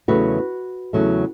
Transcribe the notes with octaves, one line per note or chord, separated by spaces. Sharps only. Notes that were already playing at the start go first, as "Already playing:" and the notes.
E2 C#3 F#3 A3 F#4 B4
E2 C#3 F#3 A3